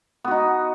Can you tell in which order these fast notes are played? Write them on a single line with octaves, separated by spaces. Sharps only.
B3 F#4 D#4